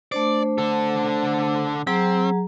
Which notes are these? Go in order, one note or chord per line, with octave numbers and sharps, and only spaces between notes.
A3 D4 C5 D5
D3 A4
F#3 C4 G#4 A#5